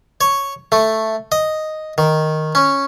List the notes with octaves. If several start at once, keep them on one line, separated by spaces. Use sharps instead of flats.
C#5
A3
D#5
D#3
C#4